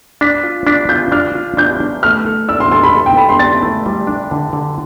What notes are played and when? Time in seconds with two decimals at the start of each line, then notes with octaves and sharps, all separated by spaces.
0.21 D4 B6
0.44 F4
0.67 D4 B6
0.89 F4 G6
1.12 D4 F6
1.35 F4
1.57 D4 G6
1.80 D4
2.03 A3 F6
2.27 A4
2.49 D5 E6
2.60 C6
2.71 A4 C6
2.83 B5
2.94 A4
3.06 G5
3.17 A4 B5
3.29 C6
3.39 D5 A6
3.62 A3
3.86 G3
4.07 D4
4.31 D3
4.53 D3